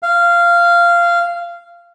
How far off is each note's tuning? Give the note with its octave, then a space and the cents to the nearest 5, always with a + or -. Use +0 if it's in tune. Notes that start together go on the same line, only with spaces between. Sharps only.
F5 -15